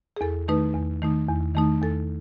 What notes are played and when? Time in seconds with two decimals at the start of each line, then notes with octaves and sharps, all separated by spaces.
0.17 G#4
0.21 E2 A4
0.48 D#3 A3 D#4 B4
0.74 E2
1.02 D#3 A3 D#4
1.29 E2
1.55 D#3 A3 D#4
1.82 E2 A4